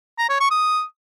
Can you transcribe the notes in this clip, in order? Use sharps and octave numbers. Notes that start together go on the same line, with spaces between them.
A#5
C#5
C#6
D#6